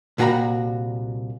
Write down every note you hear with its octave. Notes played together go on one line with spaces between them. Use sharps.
C2 A#2 F#4 G5 A#5 B5